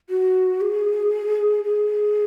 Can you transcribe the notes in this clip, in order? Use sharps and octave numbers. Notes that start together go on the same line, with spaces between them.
F#4
G#4
G#4